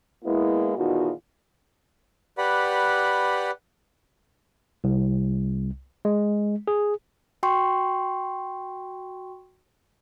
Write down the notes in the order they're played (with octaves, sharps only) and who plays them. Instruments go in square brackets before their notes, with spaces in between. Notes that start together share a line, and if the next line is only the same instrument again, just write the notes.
[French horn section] G#3 A#3 B3 E4
E2 B2 D#3 D#4 F4 F#4
[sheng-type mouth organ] G4 B4 D5 F#5 B5
[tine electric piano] C2
G#3
G#4
[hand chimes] F#4 G5 C6 C#6